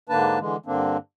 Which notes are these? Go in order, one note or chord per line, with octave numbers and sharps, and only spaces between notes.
G#2 D3 A#3 D4 B4 A5
D3 E3 G#3
G2 D3 A#3 C4 D4